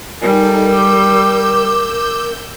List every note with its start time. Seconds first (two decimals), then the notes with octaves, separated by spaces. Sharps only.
0.22 G3 D#4 A4 A#4 G#5
0.66 D6 E6 G6